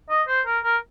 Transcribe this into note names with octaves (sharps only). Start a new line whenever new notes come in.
D#5
C5
A#4
A#4